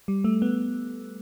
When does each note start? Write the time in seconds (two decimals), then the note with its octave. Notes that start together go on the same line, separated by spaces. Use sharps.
0.08 G3
0.24 A3
0.42 B3